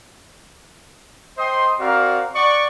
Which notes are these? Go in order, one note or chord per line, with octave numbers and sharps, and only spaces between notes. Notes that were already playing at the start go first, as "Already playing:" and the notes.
C5 D#5 G5 C6 D#6
C4 F#4 A#4 D5 F5
D5 F#5 C#6